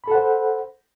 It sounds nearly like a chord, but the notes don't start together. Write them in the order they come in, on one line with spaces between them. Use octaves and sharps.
B5 A4 F#5 C5